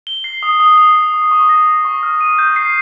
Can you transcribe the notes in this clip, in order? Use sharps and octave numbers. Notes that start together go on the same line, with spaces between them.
G7
C7
D#6
D#6
G7
C7
C#6
C#6
A#6
C#6
C#6
F6
D#7
G6
C7